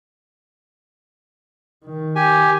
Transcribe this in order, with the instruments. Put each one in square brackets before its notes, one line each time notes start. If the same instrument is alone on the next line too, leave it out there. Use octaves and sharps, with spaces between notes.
[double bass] D#3
[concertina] G4 G#5